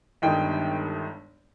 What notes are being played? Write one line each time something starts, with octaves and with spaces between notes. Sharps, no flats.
G1 G2 D#3 G#3 D#4 G5